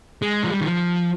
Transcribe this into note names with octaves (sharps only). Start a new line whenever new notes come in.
G#3
F3
G3
D#3
F3